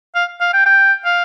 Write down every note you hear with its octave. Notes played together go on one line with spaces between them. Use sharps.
F5
F5
G5
G5
F5